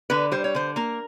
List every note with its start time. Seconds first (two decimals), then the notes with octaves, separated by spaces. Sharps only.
0.10 D3 B4
0.32 G3 C5
0.44 C#5
0.55 D3 C5
0.76 A#3 A#4